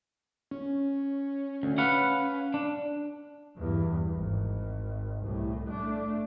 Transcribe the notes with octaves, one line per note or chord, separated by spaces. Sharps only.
C#4
D2
B4 F5 F#5
D4
E2 G2
G#1
C2 A2
A3 D4